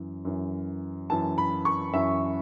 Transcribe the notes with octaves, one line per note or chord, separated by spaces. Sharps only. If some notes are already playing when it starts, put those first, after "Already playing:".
Already playing: F#2 E3
F#2 E3
F#2 E3 A5
B5
C#6
F#2 E3 E5